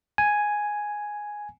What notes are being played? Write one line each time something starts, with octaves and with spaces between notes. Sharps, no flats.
G#5